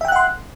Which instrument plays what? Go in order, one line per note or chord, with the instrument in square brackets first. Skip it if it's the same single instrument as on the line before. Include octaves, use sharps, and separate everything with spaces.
[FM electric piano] E5
G5
F#6
F#5
C6